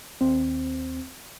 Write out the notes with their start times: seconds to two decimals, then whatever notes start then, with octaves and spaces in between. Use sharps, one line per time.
0.21 D#2 C4